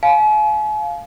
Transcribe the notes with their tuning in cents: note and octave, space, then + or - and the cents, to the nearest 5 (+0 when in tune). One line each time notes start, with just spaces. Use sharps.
F5 +0 G#5 +40